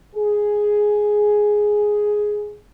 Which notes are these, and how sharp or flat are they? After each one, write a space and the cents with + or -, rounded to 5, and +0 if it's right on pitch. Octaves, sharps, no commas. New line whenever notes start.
G#4 +5